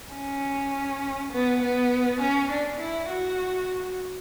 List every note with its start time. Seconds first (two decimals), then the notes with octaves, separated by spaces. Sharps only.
0.15 C#4
1.33 B3
1.62 B3
2.21 C#4
2.51 D4
2.80 E4
3.09 F#4